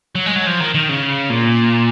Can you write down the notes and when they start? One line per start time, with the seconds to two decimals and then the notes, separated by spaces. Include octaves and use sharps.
0.15 F#3
0.26 G#3
0.36 F#3
0.47 F3
0.60 D#3
0.75 D#3
0.89 C#3
1.30 A#2